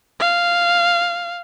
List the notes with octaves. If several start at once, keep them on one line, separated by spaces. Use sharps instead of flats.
F5